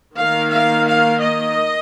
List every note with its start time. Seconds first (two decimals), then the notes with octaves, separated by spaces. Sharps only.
0.16 D#3 A#3 F5
0.52 F5
0.87 F5
1.22 D#5